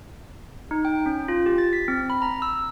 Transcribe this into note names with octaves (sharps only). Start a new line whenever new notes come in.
D#4
G5
C#4
F4
G4
A6
B6
C4
B5
A#5
E6